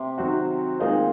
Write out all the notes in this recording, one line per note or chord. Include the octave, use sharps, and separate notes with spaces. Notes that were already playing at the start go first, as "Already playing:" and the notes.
Already playing: C3
D#3 F#3 C4 F#4
A#2 D#3 G#3 C4 D#4 G#4